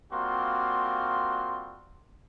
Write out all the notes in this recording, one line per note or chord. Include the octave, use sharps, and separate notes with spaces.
G3 A#3 C4 F4 F#4 C6